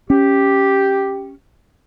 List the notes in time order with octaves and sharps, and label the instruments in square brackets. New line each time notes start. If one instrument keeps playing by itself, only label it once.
[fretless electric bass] C#4 [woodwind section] G4